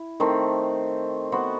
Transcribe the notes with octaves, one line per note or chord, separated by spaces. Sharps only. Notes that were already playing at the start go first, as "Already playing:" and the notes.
Already playing: E4
D#3 A3 C4
B3 F#4 C5